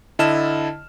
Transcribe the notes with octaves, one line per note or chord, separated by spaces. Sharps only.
D3 E4 D#5 A5 F6 E7